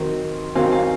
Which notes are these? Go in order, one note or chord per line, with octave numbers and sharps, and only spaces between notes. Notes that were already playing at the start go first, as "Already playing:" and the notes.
Already playing: D#3 F#3 C4
D#3 F#3 C4 F5 G#5
F5 G#5